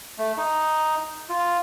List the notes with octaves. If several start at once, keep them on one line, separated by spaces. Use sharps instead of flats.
A3
D#4
F4